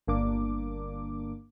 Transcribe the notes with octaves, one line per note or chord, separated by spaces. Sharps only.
G1 A#3 D4 D6